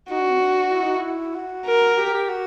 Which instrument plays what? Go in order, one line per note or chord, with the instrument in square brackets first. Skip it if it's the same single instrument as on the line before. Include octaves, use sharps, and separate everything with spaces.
[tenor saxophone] D#4 [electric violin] F#4
[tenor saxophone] D4
C4
D4
E4
D#4
E4
F#4
[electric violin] A#4
[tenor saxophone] G4
G4
F#4